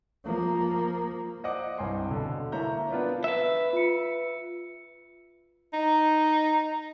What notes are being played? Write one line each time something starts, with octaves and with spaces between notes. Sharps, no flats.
F3 A#3
C5 D5 D#5 F5 F#5 D6
C2 G2 C#5 G5 G#5 C6
B2 D3
A#3 E4 C#5 E5 A#5 G6
B3 D4 F4 B4 D5
B4 E5
F4 C#7
D#4